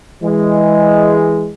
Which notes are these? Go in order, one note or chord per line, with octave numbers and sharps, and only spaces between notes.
E3 G#3